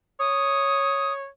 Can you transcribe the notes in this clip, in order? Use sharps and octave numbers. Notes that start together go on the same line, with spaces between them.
C#5 D#6